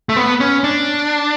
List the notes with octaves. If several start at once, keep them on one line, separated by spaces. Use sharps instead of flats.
A3
B3
C#4
D4